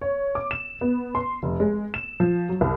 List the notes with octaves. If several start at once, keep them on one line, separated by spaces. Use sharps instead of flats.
C#5
D6
E7
B3
C6
F1
G#3
E7
F3
F#3
C2